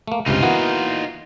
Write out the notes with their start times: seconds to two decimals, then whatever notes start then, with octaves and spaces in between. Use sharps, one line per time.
0.08 A3 A#3
0.26 C#2 G2 C3 D#4 F4
0.43 E3 A#3 B3 F#4